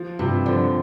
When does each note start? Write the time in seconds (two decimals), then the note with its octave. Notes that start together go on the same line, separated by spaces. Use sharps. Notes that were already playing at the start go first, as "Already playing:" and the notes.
Already playing: F3
0.19 G2 C3
0.46 D3 F3